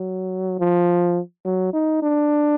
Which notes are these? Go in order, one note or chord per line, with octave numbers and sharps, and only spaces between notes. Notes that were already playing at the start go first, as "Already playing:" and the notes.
Already playing: F#3
F3
F#3
D#4
D4